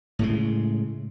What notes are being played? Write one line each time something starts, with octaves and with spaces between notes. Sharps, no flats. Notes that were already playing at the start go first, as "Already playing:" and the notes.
A2 C#3 G#3